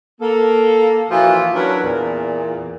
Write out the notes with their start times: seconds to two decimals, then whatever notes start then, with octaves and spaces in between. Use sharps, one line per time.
0.21 A#3 A4
1.10 A#2 E3 F3 F4 F#4
1.54 E3 F#3 C#4 D4 A#4 B4
1.83 E2 A#2